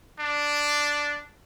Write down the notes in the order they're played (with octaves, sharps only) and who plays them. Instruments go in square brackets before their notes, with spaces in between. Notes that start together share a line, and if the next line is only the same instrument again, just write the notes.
[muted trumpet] D4